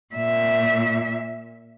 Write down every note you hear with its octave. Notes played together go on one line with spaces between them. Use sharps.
A#2 E5